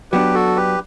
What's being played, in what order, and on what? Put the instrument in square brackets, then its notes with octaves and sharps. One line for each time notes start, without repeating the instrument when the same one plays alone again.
[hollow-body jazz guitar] F#3 B3 D4 [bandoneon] G4 B4
[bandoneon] F#4 A4
G4 B4